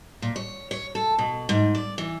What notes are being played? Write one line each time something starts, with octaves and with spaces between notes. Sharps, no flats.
A#2
C#5
C#5
A4
B2
G#2
D5
E3